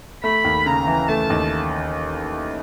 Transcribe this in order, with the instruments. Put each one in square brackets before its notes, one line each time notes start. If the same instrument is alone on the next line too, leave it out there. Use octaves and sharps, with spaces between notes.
[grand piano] A3 [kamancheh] B5
[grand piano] D#2
[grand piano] C#3 [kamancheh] A#5
[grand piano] E3
[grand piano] A3 [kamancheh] A5
[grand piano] D#2